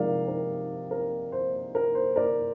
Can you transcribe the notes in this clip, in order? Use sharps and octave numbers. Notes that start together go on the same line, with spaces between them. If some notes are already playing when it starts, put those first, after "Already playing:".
Already playing: C3 F3 G#3 D#4 A#4 D5 F5
A#4
A#4
C5
A#4
C5
A#4 D5